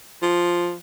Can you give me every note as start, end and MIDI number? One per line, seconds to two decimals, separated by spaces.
0.22 0.75 53